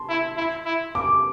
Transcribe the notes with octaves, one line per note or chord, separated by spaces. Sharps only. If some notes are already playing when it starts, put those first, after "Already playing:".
Already playing: A5 C6
E4
E4
E4
D6